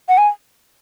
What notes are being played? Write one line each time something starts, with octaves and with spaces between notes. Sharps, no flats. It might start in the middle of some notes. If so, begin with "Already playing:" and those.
F#5
G#5